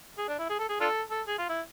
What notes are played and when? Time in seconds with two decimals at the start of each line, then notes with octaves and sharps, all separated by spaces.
0.18 G#4
0.28 D4
0.38 E4
0.49 G#4
0.59 A4
0.69 G#4
0.80 D4 F4 A4
1.11 A4
1.27 G#4
1.38 F4
1.49 E4